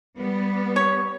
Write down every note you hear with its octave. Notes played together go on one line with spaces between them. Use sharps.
G3 B3
C#5